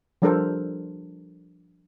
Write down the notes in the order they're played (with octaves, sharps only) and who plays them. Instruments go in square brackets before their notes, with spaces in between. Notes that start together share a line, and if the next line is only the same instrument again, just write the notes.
[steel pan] F3 G3 D4 A4 A#4 C5